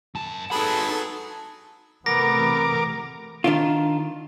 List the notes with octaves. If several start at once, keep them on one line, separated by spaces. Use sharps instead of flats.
F#2 A5
F#3 B3 D#4 G#4 A4 B5
C3 E3 A3 B3 A#4 D6 A#6
D#3 D4 F4